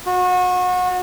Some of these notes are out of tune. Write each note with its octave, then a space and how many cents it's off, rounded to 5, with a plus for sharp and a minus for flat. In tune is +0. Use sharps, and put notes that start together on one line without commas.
F#4 -30